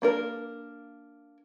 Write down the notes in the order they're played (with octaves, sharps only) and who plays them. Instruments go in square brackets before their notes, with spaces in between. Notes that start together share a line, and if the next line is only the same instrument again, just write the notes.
[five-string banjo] A#3 D4 A#4